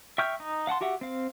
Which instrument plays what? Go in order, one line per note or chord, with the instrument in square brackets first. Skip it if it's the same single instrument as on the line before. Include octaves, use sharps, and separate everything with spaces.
[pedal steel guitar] E5 G5 C#6 F6 G6
D#4
F5 F#5 A5 C6
F#4 G4 E5 F#5
C4 F5